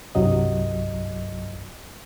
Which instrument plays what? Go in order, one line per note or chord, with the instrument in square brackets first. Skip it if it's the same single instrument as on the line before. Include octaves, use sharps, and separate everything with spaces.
[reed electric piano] C2 G2 F#3 D#5